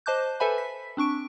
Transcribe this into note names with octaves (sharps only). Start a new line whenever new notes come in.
C5 D#5 A5 D6 F#6 G6
A4 B4 C5 E5 G#5 B5
B6
C4 D4 C#6 D7